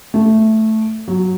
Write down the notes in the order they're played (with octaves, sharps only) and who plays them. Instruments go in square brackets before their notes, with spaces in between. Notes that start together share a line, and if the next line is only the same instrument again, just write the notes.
[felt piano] A3
F#3